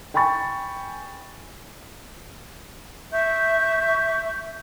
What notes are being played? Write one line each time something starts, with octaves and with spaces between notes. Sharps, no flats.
G5 G#5 B5 C#6 A6
E5 C#6 G6